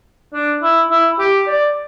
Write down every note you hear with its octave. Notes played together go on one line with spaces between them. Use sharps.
D4
E4
E4
G4
D5